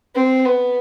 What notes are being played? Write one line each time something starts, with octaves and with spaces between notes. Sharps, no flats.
C4
B3